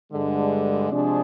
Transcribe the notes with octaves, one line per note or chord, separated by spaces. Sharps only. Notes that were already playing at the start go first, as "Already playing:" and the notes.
G2 D3 G#3
C3 F3 G#3 D4 G#4